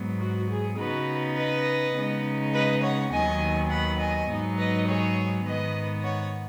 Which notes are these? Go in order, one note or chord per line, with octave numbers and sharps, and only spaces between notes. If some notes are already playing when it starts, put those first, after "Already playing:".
Already playing: G#2 F#3 B3
F#4
G#4
C#3 B3 D#4 F#4 B4
B4 D#5
C#3 G#3 B3 D#4
B4 D#5
C#5 F#5
D#2 D#3 F#3 B3 D#5 G#5
F#5 B5
D#5 G#5
G#2 F#3 B3 D#4
B4 D#5
G#4 C#5
G#2 D#3 B3 B4 D#5
C#5 F#5